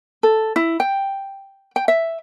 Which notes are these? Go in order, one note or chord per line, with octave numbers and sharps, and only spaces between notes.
A4
E4
G5
G5
E5